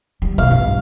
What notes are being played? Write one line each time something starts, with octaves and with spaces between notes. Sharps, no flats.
G3
B2 F5
G2